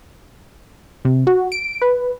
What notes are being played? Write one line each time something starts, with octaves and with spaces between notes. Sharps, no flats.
C3
F#4
D7
B4